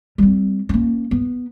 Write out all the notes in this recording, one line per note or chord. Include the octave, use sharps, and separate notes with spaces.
G3 C4
A#3 C#4
B3